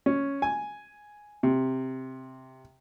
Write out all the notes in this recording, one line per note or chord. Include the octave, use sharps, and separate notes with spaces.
C#4
G#5
C3